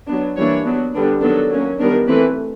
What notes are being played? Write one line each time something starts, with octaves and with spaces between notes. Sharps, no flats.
F#3 B3 D4
E3 G3 A#3 D4 C#5
F#3 B3 D4
D3 G3 B3 D4
D#3 F#3 B3 D4 A4
F#3 A#3 C#4
D#3 G3 B3 D4 A#4
E3 A3 C4 B4